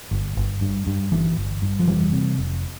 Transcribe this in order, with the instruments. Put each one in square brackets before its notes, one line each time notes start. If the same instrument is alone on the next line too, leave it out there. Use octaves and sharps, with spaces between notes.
[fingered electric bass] G1
G1
G2
G2
G1 E3
G1
G2
F3
F1 E3 G3
C3
F1